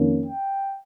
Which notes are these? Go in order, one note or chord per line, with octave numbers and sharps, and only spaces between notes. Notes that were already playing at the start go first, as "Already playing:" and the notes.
Already playing: F2 D#3 A#3 C#4
G5